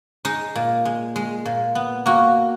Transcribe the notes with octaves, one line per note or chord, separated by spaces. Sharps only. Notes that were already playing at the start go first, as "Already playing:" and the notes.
G#3 D#4
A#2
G#3
G#3
A#2
B3
A#3 F#4